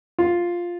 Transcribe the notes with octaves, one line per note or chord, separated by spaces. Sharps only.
F4